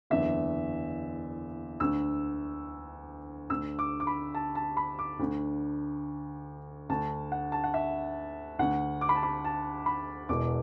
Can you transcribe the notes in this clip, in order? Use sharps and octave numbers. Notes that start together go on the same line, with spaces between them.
F#1 E2 D3 E5
D2 D3 E6
D2 D3 E6
D6
D6
B5
A5
A5
B5
D6
D2 D3
D2 D3 A5
F#5
A5
F#5
E5
D2 D3 F#5
D6
B5
A5
B5
A5
B5
E1 E2 B2 D6